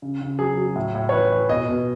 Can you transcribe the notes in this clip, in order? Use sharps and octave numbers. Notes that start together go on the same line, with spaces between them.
C#3
C#3
F#3 G#4
F#3
A2
A2
C#5
E3 B4
E3
B2 D#5
B2